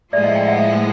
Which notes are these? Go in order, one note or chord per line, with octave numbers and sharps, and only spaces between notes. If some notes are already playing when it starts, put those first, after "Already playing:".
A2 F3 G#3 B3 D5 E5
D#5 F5
F5 G5
E5 F#5